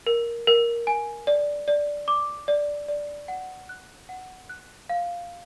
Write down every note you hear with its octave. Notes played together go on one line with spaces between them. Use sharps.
A#4
A#4
G#5
D5
D5
D6
D5
D5
F#5
F#6
F#5
F#6
F5